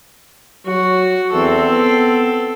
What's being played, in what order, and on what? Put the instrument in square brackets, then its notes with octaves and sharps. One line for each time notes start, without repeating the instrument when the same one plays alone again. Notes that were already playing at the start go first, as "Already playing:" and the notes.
[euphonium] F#3 [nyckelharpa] F#4
[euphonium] E2 [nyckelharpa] C4 A4
[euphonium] B3